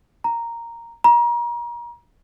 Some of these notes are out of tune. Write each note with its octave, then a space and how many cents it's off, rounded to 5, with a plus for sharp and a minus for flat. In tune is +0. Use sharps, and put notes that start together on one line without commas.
A#5 -5
A#5 +35